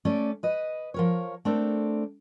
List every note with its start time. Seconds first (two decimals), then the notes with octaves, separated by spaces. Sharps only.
0.05 A3 C#4 D5
0.43 B4 D#5
0.94 F3 A#4 C#5
1.45 A3 C4 D4 A4 A#4